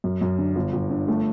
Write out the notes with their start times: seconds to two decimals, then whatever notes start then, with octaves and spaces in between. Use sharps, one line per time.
0.04 F#2
0.21 F#2
0.38 D3
0.56 G1
0.73 G1
0.91 D3
1.08 A3